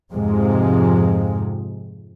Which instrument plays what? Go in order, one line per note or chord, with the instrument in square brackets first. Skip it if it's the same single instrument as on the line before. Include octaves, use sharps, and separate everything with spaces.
[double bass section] F2 G#2 C3 F3 G#3